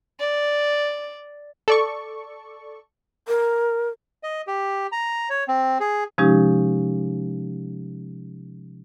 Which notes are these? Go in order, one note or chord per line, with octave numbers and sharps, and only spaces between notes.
D5
A4 D5 C#6
A#4
D#5
G4
A#5
C#5
C4
G#4
C3 F3 G#3 C#4 D#4 G4